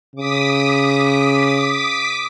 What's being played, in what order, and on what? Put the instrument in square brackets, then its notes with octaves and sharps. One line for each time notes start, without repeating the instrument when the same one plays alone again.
[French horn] C#3 [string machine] D6 D#6 B6